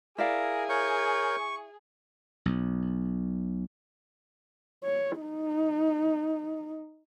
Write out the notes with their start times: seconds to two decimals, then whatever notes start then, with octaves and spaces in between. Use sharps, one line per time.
0.18 E4 G#4 A#4 D5 F5
0.69 A#4 C#5 C#6 G6
2.46 B1
4.84 C#5
5.21 D#4